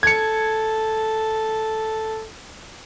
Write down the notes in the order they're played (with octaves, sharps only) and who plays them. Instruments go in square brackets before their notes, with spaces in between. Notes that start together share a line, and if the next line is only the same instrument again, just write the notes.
[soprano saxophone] A4 [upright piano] G#6 C#7